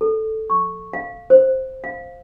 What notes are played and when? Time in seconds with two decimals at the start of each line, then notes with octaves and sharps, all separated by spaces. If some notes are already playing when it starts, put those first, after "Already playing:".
0.01 A4
0.50 C#6
0.93 F5
1.30 C5
1.84 F5